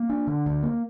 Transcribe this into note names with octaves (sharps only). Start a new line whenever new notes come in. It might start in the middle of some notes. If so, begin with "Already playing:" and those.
Already playing: A#3
D4
D3
D2
A#3